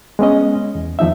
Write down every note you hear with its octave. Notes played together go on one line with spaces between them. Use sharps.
G#3 B3 C#4 D#5
E2
E2 F3 D#4 E5